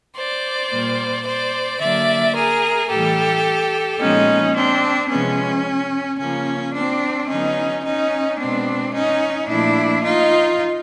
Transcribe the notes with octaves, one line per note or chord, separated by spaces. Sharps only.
C5 D5
A#2 G3 A#3
C5 D5
D3 F#3 A#3 D5 E5
G#4 A#4
A2 E3 G3 G4 A4
A#2 F3 G#3 B3 C#4 D#4
C4 D4
C3 F3 G#3 B3 C#4
C#3 F3 A#3 C#4
C4 D4
D3 F#3 B3 C#4 D#4
C#4 D#4
B2 G#3 B3 C4 D4
C#4 D#4
A#2 F3 A3 D4 E4
D#4 F4